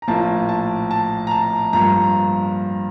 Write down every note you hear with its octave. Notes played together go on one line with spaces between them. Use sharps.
A#5
A#1 A2 F3 A#3 A5
A5
A5
A#5
A5
G2 F3 A#3 A#5